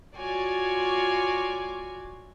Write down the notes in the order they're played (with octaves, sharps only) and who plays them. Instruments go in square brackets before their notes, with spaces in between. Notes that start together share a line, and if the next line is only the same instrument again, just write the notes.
[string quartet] F4 F#4 C#5 D5 G#5